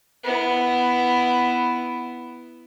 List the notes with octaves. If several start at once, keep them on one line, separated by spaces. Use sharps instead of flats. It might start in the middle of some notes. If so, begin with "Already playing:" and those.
B3 E4